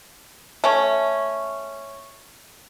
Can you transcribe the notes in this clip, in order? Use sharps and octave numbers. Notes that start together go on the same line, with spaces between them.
A3 C#4